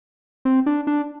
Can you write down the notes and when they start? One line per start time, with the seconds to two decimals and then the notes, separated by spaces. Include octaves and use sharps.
0.45 C4
0.66 D4
0.87 D4